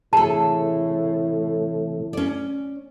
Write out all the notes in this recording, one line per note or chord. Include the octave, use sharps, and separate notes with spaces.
A2 C3 E3 A3 G#4 A4 A5
C#4 D5